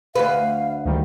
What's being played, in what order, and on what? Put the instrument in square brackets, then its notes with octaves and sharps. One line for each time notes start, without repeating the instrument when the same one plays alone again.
[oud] D2 B4 [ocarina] F5
[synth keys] D2 D#3 G3